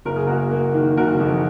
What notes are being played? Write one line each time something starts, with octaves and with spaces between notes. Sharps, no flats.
F#1 A#4
G#4
A#3 F#4 A#4
A#3
D#3
F#1 F#4 A#4
F2